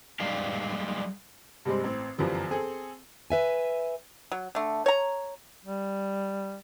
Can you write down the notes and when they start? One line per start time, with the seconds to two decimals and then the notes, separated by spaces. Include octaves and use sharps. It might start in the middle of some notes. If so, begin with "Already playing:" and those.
0.20 G3 G#3 G4 F5
1.65 G2 C3 G3 G#3 C4
1.84 A1 C4
2.18 G1 F#2 E3 F3 G3
2.49 C4 G#4 A4
3.30 B4 E5 G#5
4.32 F#3
4.55 D3 A3
4.86 C#5 A#5
5.65 G3